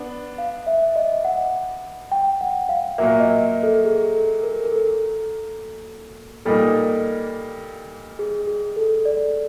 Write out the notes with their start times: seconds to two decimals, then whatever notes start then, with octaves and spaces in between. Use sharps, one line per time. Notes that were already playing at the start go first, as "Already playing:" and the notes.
Already playing: B3 D4
0.38 F5
0.67 E5
0.96 D#5
1.24 F#5
2.12 G5
2.41 F#5
2.69 F5
2.98 A#2 F#3 A#3 E5
3.20 D#5
3.63 A4
3.85 G#4
4.14 A4
4.43 A#4
4.66 A#4
4.72 A4
6.45 A#2 G3 A#3 D#4 A4
8.19 G#4
8.47 G#4
8.76 A4
9.05 D5